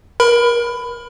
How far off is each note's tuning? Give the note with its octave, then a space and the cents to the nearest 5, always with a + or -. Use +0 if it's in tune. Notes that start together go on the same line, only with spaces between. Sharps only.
A#4 +30 B5 +15